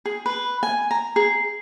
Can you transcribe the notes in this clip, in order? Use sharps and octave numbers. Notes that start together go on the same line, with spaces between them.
G#4
B4
G#5
A#5
G#4